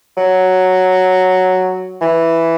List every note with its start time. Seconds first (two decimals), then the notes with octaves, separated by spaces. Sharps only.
0.17 F#3
2.01 E3